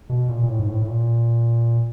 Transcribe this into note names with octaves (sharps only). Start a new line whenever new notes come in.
B2
A#2
A#2
A2
G#2
A2
A2
A#2